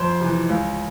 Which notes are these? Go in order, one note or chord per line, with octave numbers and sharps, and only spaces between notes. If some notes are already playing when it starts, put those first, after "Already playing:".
Already playing: F2 C5 C6
C3 E3
C#2